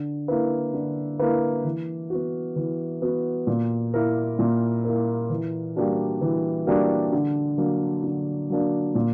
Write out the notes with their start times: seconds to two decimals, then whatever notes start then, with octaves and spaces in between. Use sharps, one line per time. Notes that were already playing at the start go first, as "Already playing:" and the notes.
Already playing: D3
0.28 A#3 E4 B4
0.74 D3
1.19 A#3 E4 B4
1.64 E3
2.10 B3 F#4
2.56 E3
3.02 B3 F#4
3.47 A#2
3.94 A#3 E4 A#4
4.39 A#2
4.84 A#3 E4 A#4
5.30 E3
5.76 G3 A#3 D4 F#4
6.21 E3
6.67 G3 A#3 D4 F#4
7.13 D3
7.58 F#3 A#3 D4
8.04 D3
8.50 F#3 A#3 D4
8.95 A#2